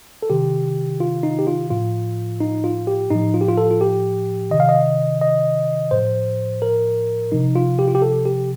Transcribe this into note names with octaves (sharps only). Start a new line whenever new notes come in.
A4
C3 D#3 G4
F4
D#4
G4
F4
A2 F3 F4
D#4
F4
G4
A2 F3 D#4
F4
G4
F4
A4
F4
G4
C3 D#3 D#5
F5
D#5
D#5
A2 F3 C5
A#4
C3 F3 D#4
F4
G4
F4
G4
A4
G4